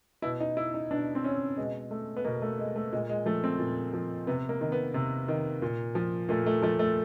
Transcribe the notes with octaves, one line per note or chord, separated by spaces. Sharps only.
B2 E4
D#4
E4
D#4
B2 D4
C4
C#4
B2 G#3
A3
B3
B2 A#3
A3
G#3
A3
A#2 G#3
G#3
F3 A3
C4
A#2
F3
C3 B3
A#3
D#3
B3
C3
D#3
A#2
F3
A#2 A3
A3
F3 A3
A3